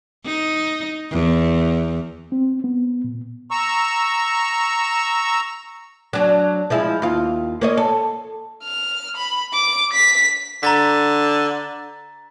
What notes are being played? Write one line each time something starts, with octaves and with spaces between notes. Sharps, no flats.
D#4
E2
C4
B3
A#2
A#5 C#6 E6
F#3 D4
F3 G#3 E4
D#2 F4
A#3 C#5 D#5
A4
F6
B5
D6
B6
D3 A#5 A6 B6